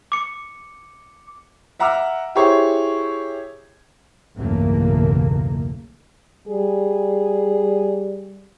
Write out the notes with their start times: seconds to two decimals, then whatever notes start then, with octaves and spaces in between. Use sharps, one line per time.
0.12 D6 C#7
1.79 E5 F#5 A#5 D6 E6 F6
2.35 E4 G4 G#4 C5 C#5
4.37 B1 E2 G2 C#3 A3 A#3
6.48 G3 G#4